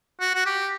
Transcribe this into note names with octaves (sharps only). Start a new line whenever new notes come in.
F#4
F#4
G4